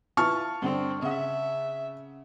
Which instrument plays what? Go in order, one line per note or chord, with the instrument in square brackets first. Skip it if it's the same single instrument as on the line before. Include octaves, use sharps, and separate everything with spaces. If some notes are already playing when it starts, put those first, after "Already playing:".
[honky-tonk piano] E4 F4 B4 [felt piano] A5 C#6 F6
[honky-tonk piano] G2 D3 D4 [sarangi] C4
[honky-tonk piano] C#3 F#5 [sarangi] E5